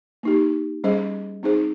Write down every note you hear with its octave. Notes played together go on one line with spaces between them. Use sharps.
A#3 D#4 G4
G3 C#4 G#4 C5 D#5
C4 D#4 G#4 C5